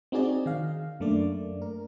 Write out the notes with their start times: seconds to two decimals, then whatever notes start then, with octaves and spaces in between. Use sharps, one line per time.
0.12 C4 D#4 F#4 G#4 D5 D#5
0.46 D#3 F5
1.00 F#2 A3 A#3 D4 D5
1.62 A#4